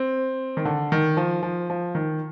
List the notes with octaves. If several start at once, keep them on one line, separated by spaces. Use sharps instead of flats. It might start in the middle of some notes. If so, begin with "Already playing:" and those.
Already playing: C4
D#3
D3
D#3
F3
F3
F3
D#3